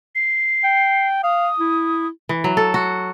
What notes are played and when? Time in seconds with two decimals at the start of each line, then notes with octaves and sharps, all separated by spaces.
0.15 C7
0.64 G5
1.23 F5 D#6
1.60 E4
2.29 E3
2.44 F#3
2.57 A4
2.74 F#4